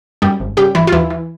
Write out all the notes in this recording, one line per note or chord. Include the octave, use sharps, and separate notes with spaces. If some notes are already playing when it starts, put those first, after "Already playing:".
F#2 G3 G4
G#1
C#3 G3 G4
G#1 E3 E4
F4
D#2 E3 E4
E3